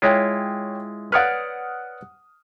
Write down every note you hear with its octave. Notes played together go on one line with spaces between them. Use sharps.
G#3 E4 F4 C#5 G5
B4 C#5 D5 F#5 D#6 F6